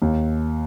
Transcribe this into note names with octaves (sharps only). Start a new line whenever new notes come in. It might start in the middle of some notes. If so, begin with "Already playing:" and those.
D#2